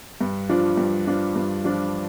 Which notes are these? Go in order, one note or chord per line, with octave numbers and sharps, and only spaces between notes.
G2
F3 D4 F4
G2
F3 D4 F4
G2
F3 D4 F4